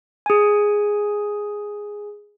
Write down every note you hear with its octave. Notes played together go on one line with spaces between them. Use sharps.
G#4 G#5